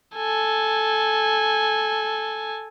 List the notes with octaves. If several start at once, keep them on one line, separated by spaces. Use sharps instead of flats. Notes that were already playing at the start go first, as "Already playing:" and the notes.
A4 G#5